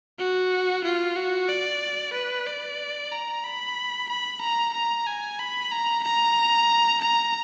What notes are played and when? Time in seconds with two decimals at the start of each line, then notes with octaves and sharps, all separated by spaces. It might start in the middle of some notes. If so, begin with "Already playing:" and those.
0.19 F#4
0.84 F4
1.16 F#4
1.49 D5
2.14 B4
2.46 D5
3.12 A#5
3.44 B5
4.09 B5
4.41 A#5
4.74 A#5
5.07 G#5
5.39 B5
5.71 A#5
6.04 A#5
7.01 A#5